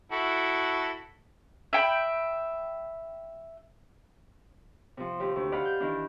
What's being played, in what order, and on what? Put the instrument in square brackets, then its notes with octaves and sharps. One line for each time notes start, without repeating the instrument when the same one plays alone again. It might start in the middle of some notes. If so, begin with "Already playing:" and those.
[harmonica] E4 F#4 A4
[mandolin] E5 G5 B5
[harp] C3 F3
D#2 G4
D2
D#4 D5 F5 F#5 B5
G6
D#3 E3 D4